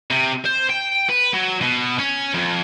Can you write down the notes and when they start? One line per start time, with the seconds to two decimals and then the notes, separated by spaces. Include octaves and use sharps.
0.11 C3
0.45 C5
0.69 G5
1.09 B4
1.33 F#3
1.61 B2
1.99 C#4
2.34 F2